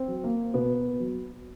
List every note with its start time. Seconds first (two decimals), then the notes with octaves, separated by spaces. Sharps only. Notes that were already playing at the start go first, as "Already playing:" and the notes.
Already playing: C4
0.08 F#3
0.24 A#3
0.54 B2 B3
1.00 F#3